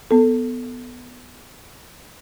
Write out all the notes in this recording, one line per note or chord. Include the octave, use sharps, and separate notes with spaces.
B3 A4